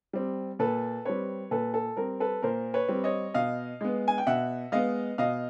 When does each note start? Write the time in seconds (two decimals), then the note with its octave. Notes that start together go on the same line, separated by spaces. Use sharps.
0.13 G3 C4
0.59 A#2 A4 B4
1.05 G3 C4 B4 C#5
1.51 A#2 A4 B4
1.74 A4
1.97 G3 C4 A#4
2.20 A4 B4
2.42 A#2 A#4 C5
2.74 B4 C#5
2.88 G3 C4
3.04 C#5 D#5
3.34 B2 D#5 F5
3.81 G#3 B3
4.08 G#5
4.18 G5
4.27 B2 E5 F#5
4.72 G#3 B3 D#5 F5
5.18 B2 D#5 F5